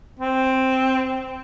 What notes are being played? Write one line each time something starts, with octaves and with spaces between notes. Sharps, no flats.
C4